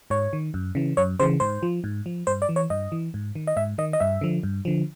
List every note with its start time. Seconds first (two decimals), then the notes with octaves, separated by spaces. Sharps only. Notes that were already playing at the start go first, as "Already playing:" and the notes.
0.10 G#2 C#5
0.33 D#3
0.54 F#2
0.75 C#3 E3
0.97 F#2 C#5
1.20 C#3 E3 C5
1.40 G#2 C5
1.63 F3
1.84 G#2
2.06 F3
2.27 G2 C5
2.42 D5
2.49 E3
2.56 C#5
2.70 G2 D#5
2.92 E3
3.14 G#2
3.35 D#3
3.47 D#5
3.56 G#2 E5
3.78 D#3 D#5
3.93 D#5
4.00 G2 E5
4.21 D3 F3
4.43 G2
4.65 D3 F3